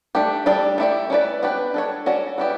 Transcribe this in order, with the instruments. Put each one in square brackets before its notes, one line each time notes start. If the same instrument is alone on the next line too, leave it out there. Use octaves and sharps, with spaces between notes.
[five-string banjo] A3 D4 G4
G3 D4 A4 D5
A3 E4 G4 D5
C#4 E4 B4 D5
B3 D4 G4 B4 D5
D4 A4 C#5
C#4 F#4 A4 D5
B3 E4 G4 D5